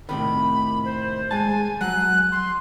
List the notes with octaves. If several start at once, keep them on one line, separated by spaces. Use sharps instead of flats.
A2 C3 D#3 B5
C5
G#3 G#5 A5
F#3 F#6
C6